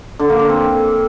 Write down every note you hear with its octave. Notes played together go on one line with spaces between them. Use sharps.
D3
A#3
D3
C4